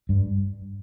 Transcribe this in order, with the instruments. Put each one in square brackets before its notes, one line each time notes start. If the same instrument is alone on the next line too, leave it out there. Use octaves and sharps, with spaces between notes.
[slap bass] G2